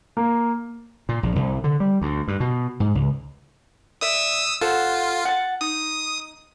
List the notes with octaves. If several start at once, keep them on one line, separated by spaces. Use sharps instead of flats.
A#3
A#2
A#1
C2
D3
G3
D2
G2
B2
G#2
C#2
D5 E5 D#6 E6
F4 A4 C5 F#5
F#5 G#5 A5
D#4 D#6